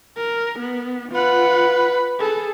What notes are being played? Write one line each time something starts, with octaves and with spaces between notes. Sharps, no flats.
A#4
B3
F4 B4 F#5
G#4 A4